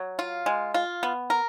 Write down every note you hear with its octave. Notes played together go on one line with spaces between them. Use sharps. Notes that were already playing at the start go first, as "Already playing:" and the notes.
Already playing: F#3
F4
G#3
F4
B3
A#4